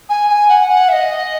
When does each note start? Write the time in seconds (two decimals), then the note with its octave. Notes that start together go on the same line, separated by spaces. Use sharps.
0.09 G#5
0.29 G#5
0.49 F#5
0.69 F#5
0.88 E5
0.92 D#5